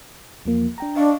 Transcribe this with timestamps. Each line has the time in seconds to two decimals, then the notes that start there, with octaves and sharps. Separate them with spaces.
0.45 E2 F3 A#3
0.78 D4 G5 A#5
0.96 D4 D#5 F5 C#6